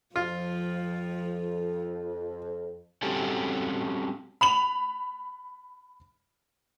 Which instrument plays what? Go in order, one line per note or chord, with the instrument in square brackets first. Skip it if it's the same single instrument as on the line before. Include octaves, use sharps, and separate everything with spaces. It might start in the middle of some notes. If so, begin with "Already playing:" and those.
[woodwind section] F2 [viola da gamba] F3 [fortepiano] F4
[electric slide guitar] G3 C4 C#4 F#4 G4 A4
[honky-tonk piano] B5 F7 F#7